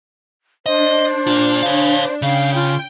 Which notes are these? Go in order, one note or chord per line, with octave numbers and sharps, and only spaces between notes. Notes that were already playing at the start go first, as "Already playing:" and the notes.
D4 C5 D#5
A#2 F4
C#5 F5
C#3 F5 G5
F4